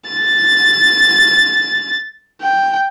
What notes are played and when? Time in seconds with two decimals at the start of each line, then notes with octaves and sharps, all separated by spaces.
0.10 A6
2.41 G5